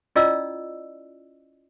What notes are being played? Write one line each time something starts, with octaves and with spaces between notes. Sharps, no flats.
C#4 E4 F4 D5 D#5 E6